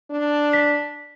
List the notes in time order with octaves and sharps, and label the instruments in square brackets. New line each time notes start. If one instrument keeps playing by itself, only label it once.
[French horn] D4
[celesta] B6